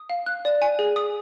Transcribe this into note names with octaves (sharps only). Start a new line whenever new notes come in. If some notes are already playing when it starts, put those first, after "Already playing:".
Already playing: D#6
F5
F#6
D5
G#5
G#4
D#6